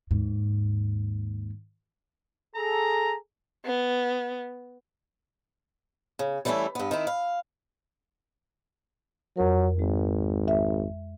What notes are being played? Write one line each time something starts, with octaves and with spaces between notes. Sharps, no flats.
D#2 G#2
G#4 A4 A#5
B3
C#3
E3 G3 A3 B3 C#4 E4
G2 B3
D#3 C4 E4
F5
F2 F#3 A#4
G#1 G#3
E5